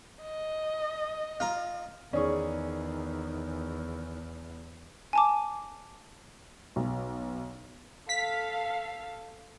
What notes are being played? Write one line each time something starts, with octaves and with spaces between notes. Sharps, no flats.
D#5
F4 A#5
E2 D#3 C#4 G#4 D5 C#6
G#5 A5 D6
B1
A4 F5 B6